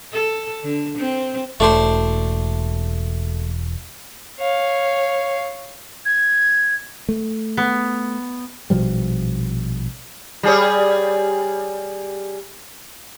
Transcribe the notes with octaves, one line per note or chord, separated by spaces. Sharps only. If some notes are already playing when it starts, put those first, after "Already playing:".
A4
D3
C4
E1 A3 D4 C5
C#5 F5
G#6
A3
B3
A#1 B2 F3 G3
G3 G#4 C#5